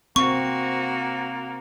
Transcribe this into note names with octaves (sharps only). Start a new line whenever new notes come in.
A#3 C4 F#4 C#6